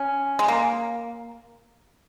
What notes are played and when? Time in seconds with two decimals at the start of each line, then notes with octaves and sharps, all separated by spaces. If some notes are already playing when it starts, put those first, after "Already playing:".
Already playing: C#4
0.39 G#3
0.48 A#3